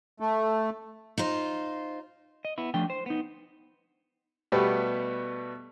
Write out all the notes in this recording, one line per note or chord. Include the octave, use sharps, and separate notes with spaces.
A3
D#4 F4 C5
D#5
B3 E4
F3 A3 D4 G5
C5
B3 D#4
B2 G3 A3 B3 G4 B4